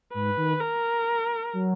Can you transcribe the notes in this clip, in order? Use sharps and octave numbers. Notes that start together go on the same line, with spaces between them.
G#2 B4
D#3
A#4
F#3